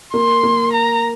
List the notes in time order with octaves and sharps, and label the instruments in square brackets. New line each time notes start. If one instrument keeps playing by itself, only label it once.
[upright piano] A#3 [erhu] C6
[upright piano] A#3
[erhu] A#5